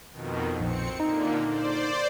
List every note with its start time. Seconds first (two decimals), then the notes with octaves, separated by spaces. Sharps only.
0.12 F2 B2 D#3
0.60 A#1 C4 C#7
1.00 A#2 D3 A#3 D#4
1.48 C5 D5